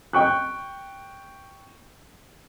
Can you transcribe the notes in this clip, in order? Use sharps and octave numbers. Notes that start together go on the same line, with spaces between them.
G5 C#6 F#6